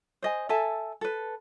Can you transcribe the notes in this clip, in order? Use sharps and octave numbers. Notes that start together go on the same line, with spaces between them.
C5 D#5 G#5
A4 E5 G#5 A5
A4 B4